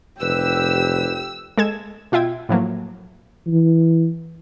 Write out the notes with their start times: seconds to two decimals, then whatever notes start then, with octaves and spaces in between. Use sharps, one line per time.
0.21 F1 G4 B4 E6
1.58 G#3 A4 G#6 E7
2.12 B2 F4 E5 G5 G#6
2.49 A2 F3 F#3 A#3
3.47 E3